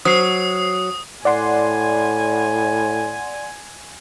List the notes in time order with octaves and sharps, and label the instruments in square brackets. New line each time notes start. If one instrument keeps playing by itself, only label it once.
[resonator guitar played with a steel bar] F#3 [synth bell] C5 C7 [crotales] D#6
[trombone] A2 [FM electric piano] D5 F#5 C6 [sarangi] G#5